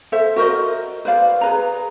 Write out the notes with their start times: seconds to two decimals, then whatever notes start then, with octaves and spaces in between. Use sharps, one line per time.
0.12 A4 C5 E5
0.36 F#4 A#4 C5 D#5
1.05 B4 C5 D5 F5
1.41 G#4 B4 A#5